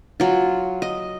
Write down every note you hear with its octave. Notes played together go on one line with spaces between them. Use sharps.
F#3 F4
D#5